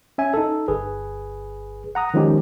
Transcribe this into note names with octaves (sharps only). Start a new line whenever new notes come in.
C#4 E5 G#5
D#4 A4
G1 G#4 B4
F#5 A#5 D#6
D#3 F3 G#3 C#4 D#4 G4